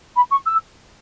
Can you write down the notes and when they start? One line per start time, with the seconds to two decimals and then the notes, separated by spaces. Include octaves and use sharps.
0.16 B5
0.30 C#6
0.45 E6